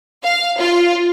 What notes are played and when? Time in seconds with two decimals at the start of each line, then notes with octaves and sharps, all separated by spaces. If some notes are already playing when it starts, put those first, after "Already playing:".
0.23 F5
0.59 F4